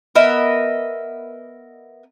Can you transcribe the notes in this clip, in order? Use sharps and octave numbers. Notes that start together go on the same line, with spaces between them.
B3 A#4 D#5 E5